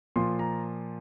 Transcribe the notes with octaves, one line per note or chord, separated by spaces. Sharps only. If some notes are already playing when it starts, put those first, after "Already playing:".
A#2 F3 C6
A#5